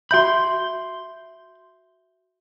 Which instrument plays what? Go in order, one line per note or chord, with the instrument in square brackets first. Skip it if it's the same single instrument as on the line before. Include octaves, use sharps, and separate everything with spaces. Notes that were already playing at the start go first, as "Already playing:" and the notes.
[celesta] F#4 E5 G6 [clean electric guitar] B5 C6